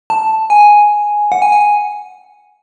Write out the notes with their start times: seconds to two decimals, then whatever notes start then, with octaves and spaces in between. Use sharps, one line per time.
0.10 A5
0.50 G#5
1.32 F#5
1.42 G#5
1.52 G#5